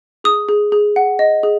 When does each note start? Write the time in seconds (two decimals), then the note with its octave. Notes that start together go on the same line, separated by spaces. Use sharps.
0.24 G#4 D#6
0.49 G#4
0.72 G#4
0.96 F#5
1.19 D#5
1.43 G#4